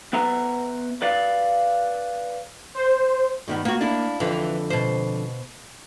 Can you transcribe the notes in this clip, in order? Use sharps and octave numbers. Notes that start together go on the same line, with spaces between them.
B3 B4 E5 A#5
B4 D5 F5
C5
G2 D#3 B3
A#3 B3 F#4
D4 E4
F2 D3 E3
B2 C5